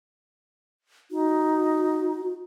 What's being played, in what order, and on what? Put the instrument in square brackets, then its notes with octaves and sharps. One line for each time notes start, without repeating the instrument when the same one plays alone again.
[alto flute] D#4 [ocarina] F#4